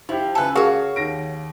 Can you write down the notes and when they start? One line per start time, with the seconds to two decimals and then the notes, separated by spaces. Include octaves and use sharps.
0.09 F3 E4 G4
0.35 C#2 A4 B4 G#5 A5
0.56 F#4 G#4 A#4 C#5 F5
0.96 D#2 A#6 D7